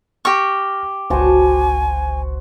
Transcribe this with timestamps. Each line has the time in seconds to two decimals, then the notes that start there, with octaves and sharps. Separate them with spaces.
0.25 G4 C#6 F6 A#6
1.10 G1 C#2 F#4 C5 G#5 A5